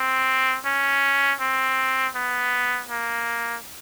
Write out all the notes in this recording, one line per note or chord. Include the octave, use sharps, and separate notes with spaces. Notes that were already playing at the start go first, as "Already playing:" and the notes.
Already playing: C4
C#4
C4
B3
A#3